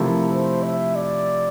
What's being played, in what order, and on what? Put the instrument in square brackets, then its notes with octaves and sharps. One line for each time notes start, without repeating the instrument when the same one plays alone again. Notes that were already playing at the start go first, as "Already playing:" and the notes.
Already playing: [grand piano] C3 F3 A3 E4 [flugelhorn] A#4
[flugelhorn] C5
E5
D5